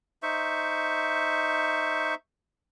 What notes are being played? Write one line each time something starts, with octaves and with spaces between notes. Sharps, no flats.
D#4 C5 E5 C#6